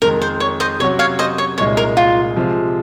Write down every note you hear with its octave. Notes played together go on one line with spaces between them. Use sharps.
F2 D#3 G#3 D#4 A#4
C5
C#5
C5 D#5
C3 F#3 C#4 F#4 C#5
C#5 F5
C5 D#5
C#5
C2 A#2 G#3 D#4 C#5
A#4
F4
C3 F3 G#3